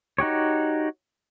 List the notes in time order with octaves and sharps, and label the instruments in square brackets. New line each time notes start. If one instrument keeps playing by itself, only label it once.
[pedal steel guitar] D#4 F#4 G4 C#5